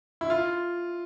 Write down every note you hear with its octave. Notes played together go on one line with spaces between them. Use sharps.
E4
F4